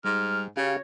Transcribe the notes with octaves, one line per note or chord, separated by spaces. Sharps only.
G#2 G3 F6
C#3 C#4 F#4 G4 C#5 F5